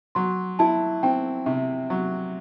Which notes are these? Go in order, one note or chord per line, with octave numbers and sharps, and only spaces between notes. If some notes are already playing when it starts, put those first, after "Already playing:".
F#3 C6
E4 A5
C4 G5
C3
F#3